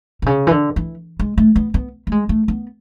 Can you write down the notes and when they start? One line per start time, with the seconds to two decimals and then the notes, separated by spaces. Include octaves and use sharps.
0.22 B2
0.26 C#3
0.47 E3
0.51 D3
0.76 E3
1.20 G#3
1.38 A3
1.56 B3
1.74 B3
2.07 A3
2.12 G#3
2.29 A3
2.48 B3